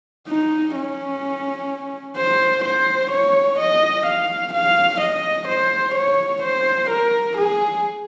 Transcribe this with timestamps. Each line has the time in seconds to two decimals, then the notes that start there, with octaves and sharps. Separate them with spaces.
0.28 D#4
0.75 C#4
2.17 C5
2.65 C5
3.12 C#5
3.60 D#5
4.07 F5
4.54 F5
5.01 D#5
5.49 C5
5.95 C#5
6.43 C5
6.91 A#4
7.38 G#4